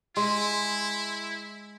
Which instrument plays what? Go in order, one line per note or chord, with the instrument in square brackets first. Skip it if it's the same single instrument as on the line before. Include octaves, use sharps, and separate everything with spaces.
[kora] G#3 [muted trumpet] E4 [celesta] C6